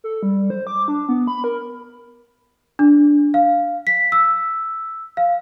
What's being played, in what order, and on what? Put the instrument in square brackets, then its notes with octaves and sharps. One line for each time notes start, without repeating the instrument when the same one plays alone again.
[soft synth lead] A4
G3
C5
D6
D4
B3
B5
A#4
[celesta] D4
F5
B6
E6
F5